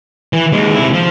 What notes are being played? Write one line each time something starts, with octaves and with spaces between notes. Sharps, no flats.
E3
D#2 G#3
C3 E4
F3